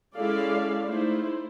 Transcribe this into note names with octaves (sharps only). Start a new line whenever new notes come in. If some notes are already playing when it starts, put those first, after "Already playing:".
G#3 C#4 E4 A4 D5 F5
A3 D#4 E4 C5